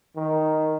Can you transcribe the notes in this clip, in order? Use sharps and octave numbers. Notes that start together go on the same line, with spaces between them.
D#3